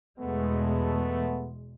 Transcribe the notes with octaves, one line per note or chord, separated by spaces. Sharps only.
E2 B2 G#3 A3 B3